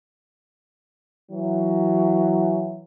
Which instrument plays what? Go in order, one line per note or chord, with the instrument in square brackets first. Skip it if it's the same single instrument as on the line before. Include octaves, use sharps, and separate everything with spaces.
[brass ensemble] E3 F#3